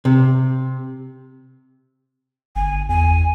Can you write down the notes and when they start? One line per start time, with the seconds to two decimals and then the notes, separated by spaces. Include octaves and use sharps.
0.05 C3
2.56 G1 G#5
2.89 E2 G#5